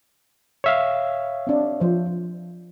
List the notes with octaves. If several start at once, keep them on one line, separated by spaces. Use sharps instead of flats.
C#5 E5 F5
C4 D4
F3 C5